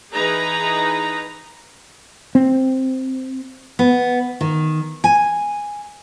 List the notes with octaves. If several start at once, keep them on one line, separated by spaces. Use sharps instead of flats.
E3 D#4 G#4 B4 A#5
C4
B3
D#3
G#5